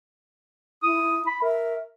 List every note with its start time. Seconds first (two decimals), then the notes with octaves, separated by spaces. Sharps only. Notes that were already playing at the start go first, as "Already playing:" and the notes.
0.83 E4 D#6
1.27 B5
1.42 A#4 E5